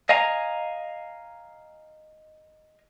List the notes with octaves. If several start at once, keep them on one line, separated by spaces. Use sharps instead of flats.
D#5 F5 G#5 A#5